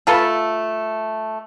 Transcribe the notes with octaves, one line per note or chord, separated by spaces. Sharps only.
A3 F4 A4 B4